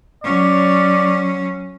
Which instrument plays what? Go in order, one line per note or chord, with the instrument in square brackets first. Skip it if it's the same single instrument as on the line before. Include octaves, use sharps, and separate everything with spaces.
[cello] F#3 C#4 [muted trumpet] D5